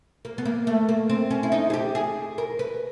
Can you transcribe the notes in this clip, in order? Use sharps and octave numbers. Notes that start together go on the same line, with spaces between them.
A#3
B3
A#3
A3
A#3
C4
C#4
E4
D#4
G#4
G4
G#4
A#4
B4